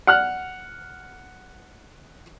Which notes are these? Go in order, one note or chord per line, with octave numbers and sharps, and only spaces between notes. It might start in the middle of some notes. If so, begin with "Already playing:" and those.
F#5 F6 F#6